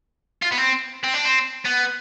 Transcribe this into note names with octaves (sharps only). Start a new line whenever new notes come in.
F4
B3
C4
C4
D4
C4
B3